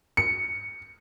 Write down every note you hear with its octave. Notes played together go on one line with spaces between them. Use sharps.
C#7